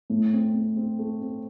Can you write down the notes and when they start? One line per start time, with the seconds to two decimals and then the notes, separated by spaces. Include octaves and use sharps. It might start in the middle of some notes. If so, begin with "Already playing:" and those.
0.10 A2
0.33 C4
0.54 C4
0.76 C4
0.99 A3
1.21 C4